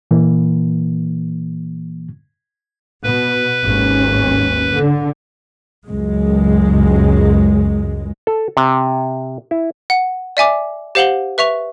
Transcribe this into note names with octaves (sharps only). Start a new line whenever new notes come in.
A#2 E3 A#3
B2 B4
G#1 D#2 C#4
D3
C#2 F#2 G#3
A4
C3
E4
F#5
D5 E5 G#5 D6
G4 C5 F5 F#5 F#7 G7
B4 E5 C#6 F7